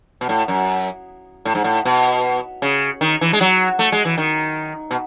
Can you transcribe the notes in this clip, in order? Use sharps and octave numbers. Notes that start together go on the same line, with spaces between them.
B2
A2
F#2
A2
G#2
A2
B2
C#3
D#3
E3
G#3
F#3
A3
G#3
E3
D#3
B2